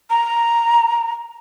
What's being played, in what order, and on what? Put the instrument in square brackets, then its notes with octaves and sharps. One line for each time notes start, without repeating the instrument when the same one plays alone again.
[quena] A#5